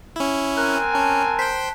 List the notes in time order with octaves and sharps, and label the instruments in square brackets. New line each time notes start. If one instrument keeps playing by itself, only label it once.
[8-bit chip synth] C#4 E4
[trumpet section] C4 G#5 [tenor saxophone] A#4 [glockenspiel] F#6
[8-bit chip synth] C#4 [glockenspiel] A5
[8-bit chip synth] C5 G5 [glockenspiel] B6